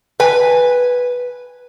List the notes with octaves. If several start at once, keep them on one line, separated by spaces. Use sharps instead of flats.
B4 G#5